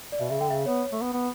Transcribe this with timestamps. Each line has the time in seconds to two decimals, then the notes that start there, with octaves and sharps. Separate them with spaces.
0.12 D5
0.19 B2 E5
0.29 C#3 E5
0.41 D3 G5
0.50 C#3 E5
0.66 B3 C#5
0.92 A3
1.02 B3
1.13 B3